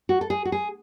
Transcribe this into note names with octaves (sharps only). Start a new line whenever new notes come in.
F#4
A4
G#4
F#4
G#4